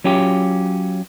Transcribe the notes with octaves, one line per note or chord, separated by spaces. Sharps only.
F#3 C#4 F4 G4